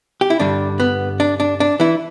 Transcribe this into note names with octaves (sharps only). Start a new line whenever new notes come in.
G4
E4
G2 D3 G3 D4
B3
D4
D4
D4
E3 E4